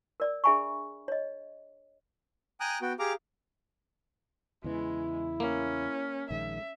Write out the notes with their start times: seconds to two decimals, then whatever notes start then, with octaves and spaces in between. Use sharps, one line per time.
0.20 A#4 D5 E6
0.44 D4 G#4 E5 G#5 B5 C#6
1.08 C#5 D#5
2.60 G5 G#5 A#5 D#6 F#6
2.82 B3 F#4 G5
2.99 G4 G#4 F5 A#5 D6
4.64 E2 C#3 E3 G#3 E4
5.40 A#3 C#4
6.31 A#1 D#3 G#3 E5